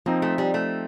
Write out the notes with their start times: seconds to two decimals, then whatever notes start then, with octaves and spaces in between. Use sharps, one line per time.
0.06 F3 A#3 C4 D#4
0.22 A3
0.38 G3
0.54 A3